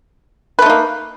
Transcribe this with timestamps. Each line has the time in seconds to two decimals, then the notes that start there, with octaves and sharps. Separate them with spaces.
0.59 B4
0.62 A3
0.66 D#4
0.70 A#3